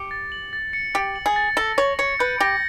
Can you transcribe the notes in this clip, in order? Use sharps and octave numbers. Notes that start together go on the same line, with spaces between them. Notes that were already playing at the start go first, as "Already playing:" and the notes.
Already playing: G4 C#7
A6
F#7
A6
C#7
G4 A6
F#7
G#4
A6
A4 A#6
C#5 F#7
C#5 C#7
B4 G6
G4 A#6